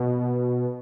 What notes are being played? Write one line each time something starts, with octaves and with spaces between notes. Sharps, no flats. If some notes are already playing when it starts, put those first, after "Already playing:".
Already playing: B2